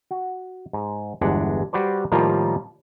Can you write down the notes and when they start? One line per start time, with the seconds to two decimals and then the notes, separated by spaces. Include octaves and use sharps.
0.11 F#4
0.73 G#2
1.21 G1 E2 G#3 D4 F#5
1.73 G3 F#4 B4 C5 D5
2.12 A2 D#3 F3 G3 A#3 F4